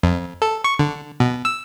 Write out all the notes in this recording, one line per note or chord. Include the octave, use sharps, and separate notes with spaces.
F2
A4
C#6
D3
B2
E6